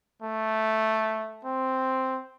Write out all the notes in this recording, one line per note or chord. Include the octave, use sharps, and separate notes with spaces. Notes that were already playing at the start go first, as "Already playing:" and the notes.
A3
C4